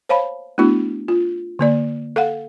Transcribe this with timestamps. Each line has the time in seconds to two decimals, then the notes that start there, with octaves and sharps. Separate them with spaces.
0.09 C5 C#5 F5 A5 B5
0.58 A3 B3 D4 E4 F#4
1.08 F4
1.59 D3 A#3 D5
2.16 A4 F5 F#5